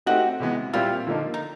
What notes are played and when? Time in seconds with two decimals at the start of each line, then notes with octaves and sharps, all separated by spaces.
0.06 A3 C4 D#4 F#4 G4
0.40 C3 E3 G#3 B3
0.73 A#2 G3 C4 E4 F4 G4
1.07 D3 F3 A#3 D#4
1.34 D#4